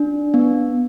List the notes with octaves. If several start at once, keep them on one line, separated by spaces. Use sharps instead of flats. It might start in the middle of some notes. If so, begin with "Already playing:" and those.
Already playing: D4
B3